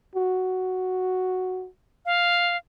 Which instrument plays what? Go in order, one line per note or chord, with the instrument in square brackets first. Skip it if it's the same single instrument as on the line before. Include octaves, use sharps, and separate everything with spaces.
[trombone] F#4
[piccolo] F5